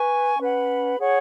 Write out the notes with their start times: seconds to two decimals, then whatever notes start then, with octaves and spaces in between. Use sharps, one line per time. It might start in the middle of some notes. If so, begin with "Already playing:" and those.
Already playing: B4 G#5 C#6
0.39 C#4 B4 F#5 B5
0.99 G#4 C#5 F#5 C#6